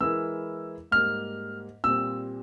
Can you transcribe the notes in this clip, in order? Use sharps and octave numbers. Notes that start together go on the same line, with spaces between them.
E3 G#3 E4 A#4 E6
G#2 G3 A#3 F6
A#2 G3 C4 E6